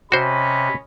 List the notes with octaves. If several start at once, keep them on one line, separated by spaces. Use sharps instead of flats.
C3 C#4 F#4 C5 D#5 B5